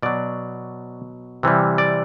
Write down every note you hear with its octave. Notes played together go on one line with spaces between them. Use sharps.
B2 F#3 D5
C3 E3 G3
D5